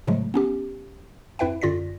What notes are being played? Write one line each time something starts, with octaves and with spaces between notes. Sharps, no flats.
A2 C#3 F3 F#3 G#3 A3
B3 C#4 G4
F2 E4 B4 E5 G5
F#2 D3 F4 D5 A#6 B6